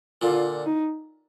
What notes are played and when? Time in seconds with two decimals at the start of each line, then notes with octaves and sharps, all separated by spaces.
0.22 A#2 D3 F4
0.66 D#4